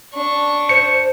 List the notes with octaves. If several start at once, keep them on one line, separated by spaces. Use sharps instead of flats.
D4 C#6
C5 C#7